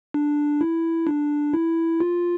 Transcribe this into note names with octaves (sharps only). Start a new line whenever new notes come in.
D4
E4
D4
E4
F4